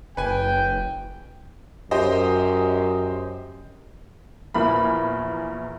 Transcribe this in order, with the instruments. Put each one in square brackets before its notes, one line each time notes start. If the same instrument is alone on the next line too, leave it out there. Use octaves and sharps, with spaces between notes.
[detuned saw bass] F#1 [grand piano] B4 G#5 [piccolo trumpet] G5
[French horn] F#2 [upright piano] G4 C5 D#5
[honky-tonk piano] A#1 E2 A#3 B5